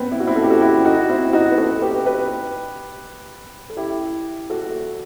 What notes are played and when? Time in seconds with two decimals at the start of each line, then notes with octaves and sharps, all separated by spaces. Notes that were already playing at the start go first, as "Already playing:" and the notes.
Already playing: B3 C4
0.12 E4
0.20 F#4
0.27 C4 E4
0.36 A4
0.43 G4
0.50 F#4 A4
0.61 E4 G4
0.85 D#4 F#4
1.09 C4 E4
1.33 D#4 F#4
1.51 B4
1.58 F#4 A4
1.82 G4 B4
2.06 G4 B4
3.70 A4
3.77 E4 G4
4.50 F#4 A4